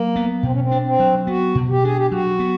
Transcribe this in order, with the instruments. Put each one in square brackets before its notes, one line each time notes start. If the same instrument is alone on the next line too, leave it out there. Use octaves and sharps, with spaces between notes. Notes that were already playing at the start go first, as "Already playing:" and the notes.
Already playing: [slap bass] F#3 [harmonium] A#3
[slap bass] B3
[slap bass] B2 [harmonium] C4
[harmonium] C#4
C4
[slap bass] D4
[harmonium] C4
[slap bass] F#3
[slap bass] B3 [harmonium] F#4
[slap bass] B2
[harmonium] G4
[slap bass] D4 [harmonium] G#4
[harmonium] G4
[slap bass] F#3 [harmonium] F#4
[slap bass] B3